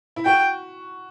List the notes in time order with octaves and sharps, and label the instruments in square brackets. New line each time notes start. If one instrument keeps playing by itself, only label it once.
[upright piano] E4
[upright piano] F#4 [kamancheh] G5